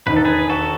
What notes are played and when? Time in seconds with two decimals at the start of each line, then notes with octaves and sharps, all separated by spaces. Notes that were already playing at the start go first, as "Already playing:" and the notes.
0.06 E1 D#2 D#3 B4
0.17 A4
0.25 G#4 B4
0.49 F#4 A4